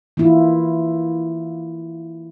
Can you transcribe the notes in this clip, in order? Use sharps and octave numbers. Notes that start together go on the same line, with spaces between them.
E3 A#3 E4 F4